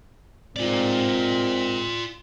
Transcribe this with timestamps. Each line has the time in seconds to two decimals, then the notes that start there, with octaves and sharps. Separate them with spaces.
0.56 G#2 C4 F4 A#4 D5